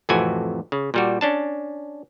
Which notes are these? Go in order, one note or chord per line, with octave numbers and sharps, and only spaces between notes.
F2 A2 C3 E3 F#4 G#5
C#3
A#2 G3 F#4
C#4 D4 A5